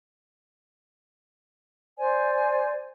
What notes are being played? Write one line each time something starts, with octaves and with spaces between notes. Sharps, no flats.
C5 D5 G#5